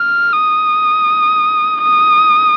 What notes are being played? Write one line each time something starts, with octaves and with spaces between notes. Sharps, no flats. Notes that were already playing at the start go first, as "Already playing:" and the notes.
Already playing: F6
D#6
D#6